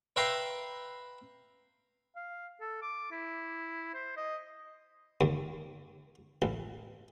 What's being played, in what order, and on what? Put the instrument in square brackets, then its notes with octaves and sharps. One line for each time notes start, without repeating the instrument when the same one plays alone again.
[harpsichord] B4 E5 F5 G5 A#5 C6
[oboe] F5
A4
D6
E4
C5
D#5
[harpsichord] D#2
A1